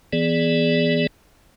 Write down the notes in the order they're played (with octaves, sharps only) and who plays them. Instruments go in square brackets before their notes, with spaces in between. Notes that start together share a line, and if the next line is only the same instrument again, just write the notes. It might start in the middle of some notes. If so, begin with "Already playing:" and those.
[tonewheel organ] E3 B3 G#4 D5